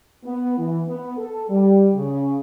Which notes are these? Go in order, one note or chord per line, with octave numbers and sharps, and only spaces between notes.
B3
E3
B3
A4
G3
C#3